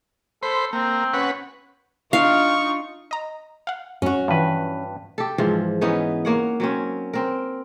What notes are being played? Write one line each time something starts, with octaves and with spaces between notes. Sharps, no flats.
A4 C5 B5
A#3 C4
C#4 B4 F#5
D4 D#4 F4 F5 C#6
D#5 A#5
F5 F#5
F#2 F#3 C#4 F#4
G2 E3 F3 B4
G4 A4
G#2 E3 F3
E3 B3 C#4 D#4
A#3 C#5 F#5
F#3 C4 C#4
C4 A#4